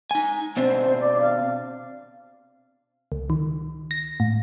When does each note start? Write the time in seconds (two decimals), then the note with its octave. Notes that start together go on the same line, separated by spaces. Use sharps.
0.11 D#4 G#5
0.57 B2 C4 D4 C5
1.00 D5
1.20 F5
3.12 C#2
3.30 D#3
3.91 A#6
4.20 A2